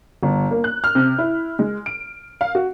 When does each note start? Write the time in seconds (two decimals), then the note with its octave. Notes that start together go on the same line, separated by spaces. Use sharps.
0.23 G1
0.51 A#3
0.64 F#6
0.84 F6
0.95 C3
1.18 E4
1.59 G#3
1.86 D7
2.41 F5
2.55 F#4